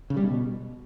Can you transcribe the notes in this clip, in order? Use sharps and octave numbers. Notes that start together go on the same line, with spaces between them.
C#3
G3
B2